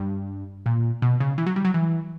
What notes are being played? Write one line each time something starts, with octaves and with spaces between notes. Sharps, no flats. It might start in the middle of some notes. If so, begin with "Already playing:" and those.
Already playing: G2
A#2
B2
C#3
E3
F#3
G3
F#3
E3